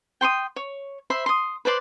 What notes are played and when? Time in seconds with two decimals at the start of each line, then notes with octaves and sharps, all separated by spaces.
0.21 G5 C6 C#6 D#6
0.56 C#5
1.10 C5 E5 B5 C6
1.26 C6 D#6
1.65 B4 C5 D5 C6